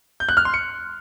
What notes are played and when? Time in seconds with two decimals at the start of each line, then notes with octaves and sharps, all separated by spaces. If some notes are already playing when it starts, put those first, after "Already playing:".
0.20 G6
0.29 F#6
0.37 F6
0.45 C6
0.54 C#7